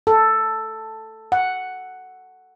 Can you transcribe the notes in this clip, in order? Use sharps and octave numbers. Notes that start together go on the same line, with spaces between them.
A4
F#5